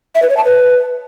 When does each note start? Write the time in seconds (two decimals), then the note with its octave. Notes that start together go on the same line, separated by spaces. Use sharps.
0.15 E5
0.22 B4
0.30 C#5
0.37 A5
0.44 B4